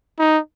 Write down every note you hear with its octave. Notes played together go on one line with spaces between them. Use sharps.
D#4